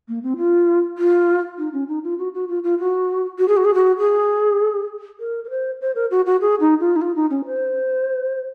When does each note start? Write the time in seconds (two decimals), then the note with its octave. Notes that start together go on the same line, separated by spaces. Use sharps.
0.08 A#3
0.23 C4
0.37 F4
0.98 F4
1.58 D#4
1.73 C#4
1.88 D#4
2.04 F4
2.18 F#4
2.34 F#4
2.48 F4
2.64 F4
2.79 F#4
3.39 F#4
3.48 G#4
3.57 F#4
3.65 G#4
3.74 F#4
3.99 G#4
5.20 A#4
5.44 A#4
5.50 C5
5.81 C5
5.95 A#4
6.11 F#4
6.26 F#4
6.41 G#4
6.60 D#4
6.80 F4
6.96 D#4
7.01 F4
7.16 D#4
7.30 C#4
7.46 C5